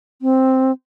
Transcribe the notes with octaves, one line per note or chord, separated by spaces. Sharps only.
C4